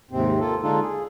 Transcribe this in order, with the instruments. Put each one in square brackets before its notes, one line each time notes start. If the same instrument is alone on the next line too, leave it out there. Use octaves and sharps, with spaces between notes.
[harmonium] D#2 G#2 C3 C4
A#3 F4 A4
D3 G#3 D4 D#4 F4 A4
G#4